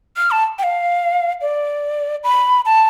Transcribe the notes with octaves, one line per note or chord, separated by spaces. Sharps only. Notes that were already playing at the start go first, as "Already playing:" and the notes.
F6
A5
G5
F5
D5
B5
A5